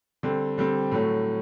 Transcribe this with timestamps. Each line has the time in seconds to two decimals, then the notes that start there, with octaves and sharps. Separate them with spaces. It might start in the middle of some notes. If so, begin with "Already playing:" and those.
0.23 D3 G3 C4
0.58 D3 G3 C4
0.91 A2 F#3 A3